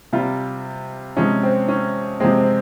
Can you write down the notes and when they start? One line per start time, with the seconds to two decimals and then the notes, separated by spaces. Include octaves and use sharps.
0.13 C3 G3 F4
1.17 C3 F3 G#3 C#4
1.43 C4
1.68 C#4
2.20 C3 F3 G#3 C4
2.37 C4